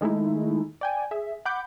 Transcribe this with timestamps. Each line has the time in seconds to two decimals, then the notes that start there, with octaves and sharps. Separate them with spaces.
0.01 D#3 G#3 A3 D#4 E4
0.81 D5 G5 G#5
1.11 G#4 E5
1.45 F#5 B5 D6 G6